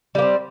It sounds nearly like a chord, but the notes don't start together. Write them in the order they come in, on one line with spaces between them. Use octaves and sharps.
G3 A#3 C4